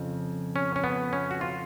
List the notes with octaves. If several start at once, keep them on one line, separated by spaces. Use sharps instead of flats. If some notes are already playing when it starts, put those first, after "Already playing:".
Already playing: F2 C#3 F3
C#4
C#4
B3
C#4
F#4
F4